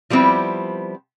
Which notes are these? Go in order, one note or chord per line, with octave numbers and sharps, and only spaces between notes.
F3 G3 B3 C4 E4